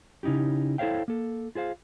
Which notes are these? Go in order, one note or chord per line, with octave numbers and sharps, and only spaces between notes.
C#3 C#4 D#4 E4 G4
E4 A4 C5 C#5 F5 G5
A#3 A4
F4 G#4 C5 F5